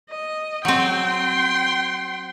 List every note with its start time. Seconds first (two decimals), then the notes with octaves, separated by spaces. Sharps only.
0.10 D#5
0.65 F#3 C4 G5 C6